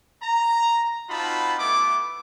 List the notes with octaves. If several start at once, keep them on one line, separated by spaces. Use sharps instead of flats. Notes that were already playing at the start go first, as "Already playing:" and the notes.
A#5
C4 D#4 F4 F#4 A5 B5
A3 B3 E4 A4 D6